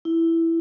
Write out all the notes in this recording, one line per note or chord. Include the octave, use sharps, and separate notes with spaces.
E4